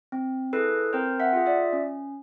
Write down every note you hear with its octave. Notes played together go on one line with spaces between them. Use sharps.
C4
E4 G#4 A4 B4
C4 A#4 C5
E5 F#5
F4 G#4
D5 E5
C#4